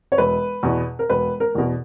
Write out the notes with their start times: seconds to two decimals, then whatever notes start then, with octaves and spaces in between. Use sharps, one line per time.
0.12 C#5
0.17 E1 B4
0.63 E2 B2
0.99 A#4
1.09 E1 B4
1.40 A#4
1.55 E2 B2